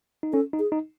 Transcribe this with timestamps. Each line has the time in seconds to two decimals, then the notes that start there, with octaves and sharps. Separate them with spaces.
0.23 D#4
0.33 C#4 A4
0.53 D#4
0.59 G#4
0.72 D#4